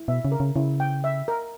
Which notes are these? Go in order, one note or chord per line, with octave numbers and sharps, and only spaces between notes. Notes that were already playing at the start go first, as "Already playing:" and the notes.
Already playing: E4
B2 E5
C#3
A#4
C#3
C#3 E4
G5
E5
A#4